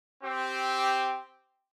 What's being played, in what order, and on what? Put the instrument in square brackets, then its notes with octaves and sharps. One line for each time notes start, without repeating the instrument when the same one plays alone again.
[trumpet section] C4 G4